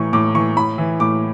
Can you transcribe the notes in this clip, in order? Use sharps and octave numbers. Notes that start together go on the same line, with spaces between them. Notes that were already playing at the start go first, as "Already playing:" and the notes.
Already playing: A2 E3 C#6
A2 D6
E3 C#6
A2 B5
E3
A2 D6